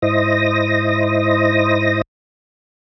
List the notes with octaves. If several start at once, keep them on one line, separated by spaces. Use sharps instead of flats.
G#2 E4 C5 D#5 D#6 A#6